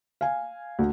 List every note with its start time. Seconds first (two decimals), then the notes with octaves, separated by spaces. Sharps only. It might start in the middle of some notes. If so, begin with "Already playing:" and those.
0.21 F5 G#5
0.79 D2